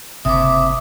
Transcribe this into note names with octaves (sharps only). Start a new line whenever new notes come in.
F#1 C3 E5 D6 D#6